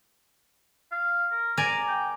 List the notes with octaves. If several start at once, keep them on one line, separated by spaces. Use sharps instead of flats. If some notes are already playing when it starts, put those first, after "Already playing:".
F5
A#4
A#4 D5 G#5 A#5
G5